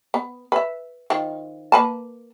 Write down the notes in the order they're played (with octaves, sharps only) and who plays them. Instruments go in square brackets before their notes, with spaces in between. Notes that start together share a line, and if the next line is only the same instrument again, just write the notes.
[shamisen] B3
B4 E5
D#3 F3
A#3 B4 A5